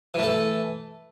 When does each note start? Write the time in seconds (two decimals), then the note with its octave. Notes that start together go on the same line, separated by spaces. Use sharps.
0.14 E3
0.18 A3
0.23 A4